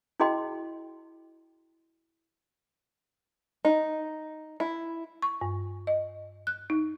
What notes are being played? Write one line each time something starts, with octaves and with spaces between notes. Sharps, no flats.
E4 F#4 G#4 D#5 G5 C6
D#4
E4
C#6
G2
D#5
F#6
D#4